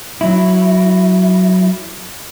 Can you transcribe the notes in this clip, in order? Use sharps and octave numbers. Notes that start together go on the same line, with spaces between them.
F#3 E4